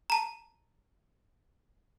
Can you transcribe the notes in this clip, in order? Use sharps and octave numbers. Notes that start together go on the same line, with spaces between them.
A5 A#5